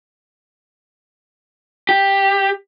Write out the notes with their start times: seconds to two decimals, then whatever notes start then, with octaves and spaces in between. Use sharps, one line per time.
1.89 G4